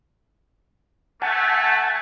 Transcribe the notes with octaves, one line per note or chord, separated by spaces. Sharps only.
A3 F#5 G#5 A5